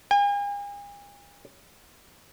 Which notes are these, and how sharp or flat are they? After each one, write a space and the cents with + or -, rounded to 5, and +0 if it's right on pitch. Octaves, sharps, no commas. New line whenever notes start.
G#5 -45